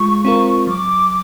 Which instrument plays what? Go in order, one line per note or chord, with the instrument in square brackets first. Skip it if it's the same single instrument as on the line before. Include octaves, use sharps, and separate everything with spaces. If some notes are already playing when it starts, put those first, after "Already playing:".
Already playing: [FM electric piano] G#3 F4 [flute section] C#6
[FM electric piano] C4 F4 A#4
[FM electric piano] F#3 [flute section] D6